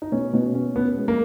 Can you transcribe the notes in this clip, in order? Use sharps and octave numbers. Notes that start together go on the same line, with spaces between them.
D#4
B2 C#4
B2
C#4
B2 B3
G#3
A#3